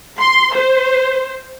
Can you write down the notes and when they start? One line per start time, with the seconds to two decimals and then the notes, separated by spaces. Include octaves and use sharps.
0.19 C6
0.53 C5